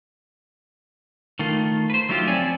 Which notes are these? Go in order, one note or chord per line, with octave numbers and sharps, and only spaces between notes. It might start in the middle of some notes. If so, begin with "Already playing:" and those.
D#3 A3 F4
B4 C5
F#3 A3 D#4 F4 G4
F2 F3 C4 C#5 D5 G#5